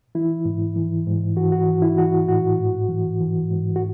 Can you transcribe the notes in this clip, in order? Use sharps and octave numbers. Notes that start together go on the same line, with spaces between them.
E3 E4
G#2
E3
G#2
E3 F#4
F#4
E3
E4
E3 F#4
A2 F#4
G#2
E3
E3
G#2
F#4